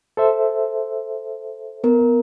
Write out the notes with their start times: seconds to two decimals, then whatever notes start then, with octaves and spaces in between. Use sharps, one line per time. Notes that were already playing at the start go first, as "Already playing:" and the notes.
0.17 A4 C5 E5
1.84 B3 A#4